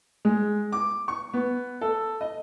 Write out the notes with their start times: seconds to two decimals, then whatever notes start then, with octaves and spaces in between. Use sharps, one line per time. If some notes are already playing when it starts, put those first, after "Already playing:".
0.25 G#3
0.72 D6
1.08 C#6
1.33 B3
1.81 A4
2.21 D#5